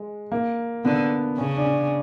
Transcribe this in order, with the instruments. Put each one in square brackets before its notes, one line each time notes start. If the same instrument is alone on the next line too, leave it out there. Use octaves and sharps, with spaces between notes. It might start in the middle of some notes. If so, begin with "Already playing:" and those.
Already playing: [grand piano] G#3
A#3
[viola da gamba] D3 [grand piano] B3
[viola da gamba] C#3 [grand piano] C#4
[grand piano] D4
C#4